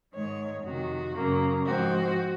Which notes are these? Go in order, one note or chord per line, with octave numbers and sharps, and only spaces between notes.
G#2 D#3 G#3 C#5
F2 C3 D#3 F#4
F#2 C#3 F#3 A#3
G#2 F3 C4 F#4